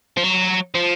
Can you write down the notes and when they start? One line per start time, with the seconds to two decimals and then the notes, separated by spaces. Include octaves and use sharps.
0.17 F3
0.24 F#3
0.75 F3